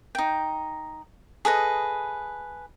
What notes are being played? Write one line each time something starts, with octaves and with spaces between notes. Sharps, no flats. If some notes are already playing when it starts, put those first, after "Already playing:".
D#4 G5
G#4 A4 B4 D#5